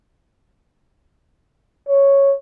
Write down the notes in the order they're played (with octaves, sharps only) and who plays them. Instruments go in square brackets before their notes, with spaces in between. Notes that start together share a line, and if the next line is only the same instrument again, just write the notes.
[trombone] C#5